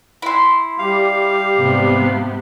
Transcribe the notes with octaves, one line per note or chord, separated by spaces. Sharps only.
E4 C6
G3 G4 F5
G#2 C3 B3